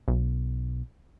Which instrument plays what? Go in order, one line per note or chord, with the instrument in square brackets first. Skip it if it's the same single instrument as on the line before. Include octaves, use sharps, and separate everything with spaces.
[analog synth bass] B1